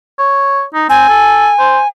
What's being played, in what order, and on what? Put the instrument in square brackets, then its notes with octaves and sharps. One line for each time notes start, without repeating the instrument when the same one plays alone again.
[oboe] C#5
D#4
[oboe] C4 [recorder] G#5
[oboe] A4
C5